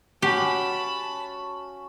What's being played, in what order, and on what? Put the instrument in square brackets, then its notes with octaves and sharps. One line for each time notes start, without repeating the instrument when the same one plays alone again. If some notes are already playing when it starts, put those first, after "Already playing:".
[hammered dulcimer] C#4 F#4 [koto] G4 [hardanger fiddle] A5 B5